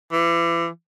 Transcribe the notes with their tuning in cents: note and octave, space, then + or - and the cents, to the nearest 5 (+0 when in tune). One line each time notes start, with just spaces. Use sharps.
E3 +35